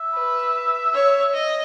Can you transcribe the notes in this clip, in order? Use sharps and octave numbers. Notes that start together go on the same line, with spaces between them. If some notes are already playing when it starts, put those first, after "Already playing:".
Already playing: E5
B4
C#5
D#5